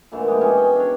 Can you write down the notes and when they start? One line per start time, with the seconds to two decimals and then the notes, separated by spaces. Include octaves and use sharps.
0.12 A#2 D3 E3 A3
0.28 G#3 G4
0.41 B2 G#3 C#4
0.57 D#5 G5 G#5
0.76 D4 C#5